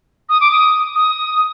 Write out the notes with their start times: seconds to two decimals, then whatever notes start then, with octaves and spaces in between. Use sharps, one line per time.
0.29 D#6
0.40 D6
0.52 D#6
0.95 D#6